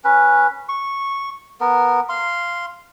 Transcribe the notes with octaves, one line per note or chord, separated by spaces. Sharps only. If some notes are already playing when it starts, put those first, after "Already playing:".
C#4 B4
C#6
B3 A#4
F5 C6